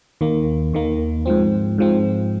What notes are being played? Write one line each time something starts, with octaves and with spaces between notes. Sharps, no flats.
D#2 D#3 A#3
D#2 D#3 A#3
G#2 F3 C4
G#2 F3 C4